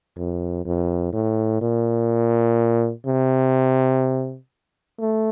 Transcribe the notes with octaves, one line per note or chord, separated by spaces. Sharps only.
F2
F2
A2
A#2
C3
A3